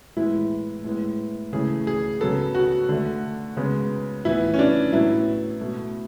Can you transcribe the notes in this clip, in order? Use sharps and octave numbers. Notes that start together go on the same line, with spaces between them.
A2 E3 G#3 B3 E4
A2 G#3 B3
C#3 E3 A3 G#4
G#4
C#3 F#3 B3 A4
F#4
D3 A3
C#3 G#3 B3
A2 E3 B3 E4
C#4
D4
A2 F#3 B3 E4
B2 A3